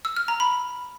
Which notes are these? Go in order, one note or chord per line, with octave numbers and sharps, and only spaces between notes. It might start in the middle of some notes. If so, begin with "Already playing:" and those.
E6
F6
A#5
B5